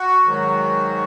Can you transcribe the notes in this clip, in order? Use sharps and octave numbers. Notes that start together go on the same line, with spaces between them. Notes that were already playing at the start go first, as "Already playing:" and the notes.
Already playing: F#4
G#2 D#3 F#3